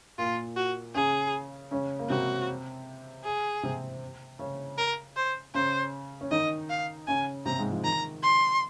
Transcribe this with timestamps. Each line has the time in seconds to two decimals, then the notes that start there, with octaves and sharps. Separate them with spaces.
0.18 A#2 A#3 F4
0.56 F#4
0.95 C#3 C#4 G#4
1.71 C#3 C#4
1.99 A#3
2.09 C3 C4 F#4
3.24 G#4
3.63 C3 C4
4.39 C#3 C#4
4.78 A#4
5.16 C5
5.54 C#3 C#4 C5
6.21 C#4
6.31 D#3 D#4 D#5
6.70 F5
7.07 C#3 C#4 G#5
7.45 C3 C4 A#5
7.59 G#2 G#3
7.72 F3
7.84 D#3 A#5
8.23 C6